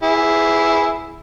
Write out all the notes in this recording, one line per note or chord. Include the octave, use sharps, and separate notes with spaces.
E4 G#4